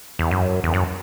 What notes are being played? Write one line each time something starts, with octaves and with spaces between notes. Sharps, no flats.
E2
F#2
E2
F#2